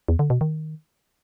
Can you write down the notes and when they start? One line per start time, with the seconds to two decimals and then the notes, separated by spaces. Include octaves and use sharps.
0.08 E2
0.19 D3
0.30 B2
0.41 D#3